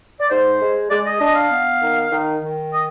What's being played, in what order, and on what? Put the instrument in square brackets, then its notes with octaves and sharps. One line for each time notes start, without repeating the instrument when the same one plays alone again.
[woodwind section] D5
G#2 C5
G#3
G#3 D5
D#5
D4 D#5
F5
B3
D#3
D#3
D#3
D#5